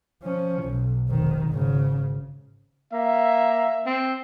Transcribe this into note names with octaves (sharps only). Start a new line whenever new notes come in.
F3 C#4
B1
F1 D#3
G#1 C#3
A#3 E5
C4